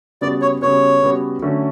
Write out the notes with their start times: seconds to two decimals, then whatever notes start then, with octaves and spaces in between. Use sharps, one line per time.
0.21 C#3 G3 B3 F#4 B4 D5
0.41 C#5
0.62 C#3 G3 B3 F#4 B4 C#5
1.02 C#3 G3 B3 F#4 B4
1.42 D3 F#3 A3 C#4